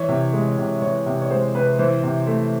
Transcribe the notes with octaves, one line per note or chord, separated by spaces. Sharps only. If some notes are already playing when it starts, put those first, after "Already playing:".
Already playing: E3 C#5
C3
G#3
C3
E3 C#5
C3
C#5
G#3 C5
C3 B4
E3 C5
C3
A3